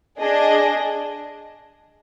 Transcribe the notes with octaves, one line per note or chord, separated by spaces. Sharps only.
D4 G#4 D#5